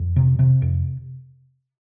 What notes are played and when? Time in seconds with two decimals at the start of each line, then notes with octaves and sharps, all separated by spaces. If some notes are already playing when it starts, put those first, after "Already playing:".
Already playing: F2
0.16 C3
0.39 C3
0.62 F2